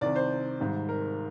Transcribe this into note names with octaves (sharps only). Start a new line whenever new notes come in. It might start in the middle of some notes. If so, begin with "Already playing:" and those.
C2 C3 D#3 D5
C5
G#1 G#2 G3
A#4